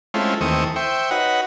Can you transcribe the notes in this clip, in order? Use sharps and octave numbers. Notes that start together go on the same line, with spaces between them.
G#3 A3 C4 C#4 E4 F4
D#2 E3 A3 C4 C#6 D#6
C5 E5 G5 C#6
D#4 F#4 B4 C#5 F#5